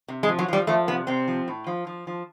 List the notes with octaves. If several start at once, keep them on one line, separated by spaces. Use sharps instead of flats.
C3
G#3
F3
F#3
F3 G3
F3 A3
C3 B3
C3 C4
F3
A2
F3
F3
F3